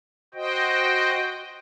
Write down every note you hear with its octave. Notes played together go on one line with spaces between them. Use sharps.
F#4 C5 D#5 G5